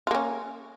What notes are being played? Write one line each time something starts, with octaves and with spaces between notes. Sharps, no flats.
A#3 C#4 F4